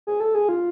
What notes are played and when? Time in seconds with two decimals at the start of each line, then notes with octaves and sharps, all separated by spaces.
0.07 G#4
0.20 A4
0.35 G#4
0.49 F4